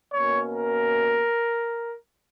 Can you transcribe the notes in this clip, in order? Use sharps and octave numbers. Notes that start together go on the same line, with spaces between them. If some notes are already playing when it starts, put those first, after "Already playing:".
B2 A#3 C#4 C#5
A#4